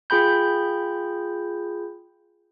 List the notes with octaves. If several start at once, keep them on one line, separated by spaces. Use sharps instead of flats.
F4 G#4 G5 B5 G6